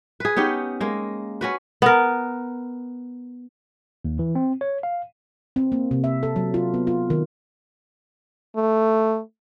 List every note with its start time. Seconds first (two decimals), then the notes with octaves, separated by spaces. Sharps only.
0.20 G#4 B4
0.37 B3 C#4 D#4 G4
0.81 G#3 A#3
1.41 C#4 F#4 B4
1.82 B3 A#4
4.05 D#2
4.19 E3
4.35 C4
4.61 C#5
4.83 F5
5.56 C4
5.72 A#3
5.91 C3
6.04 E5
6.23 A4
6.36 F#3
6.54 F4
6.74 B3
6.87 F4
7.10 D#3
8.56 A3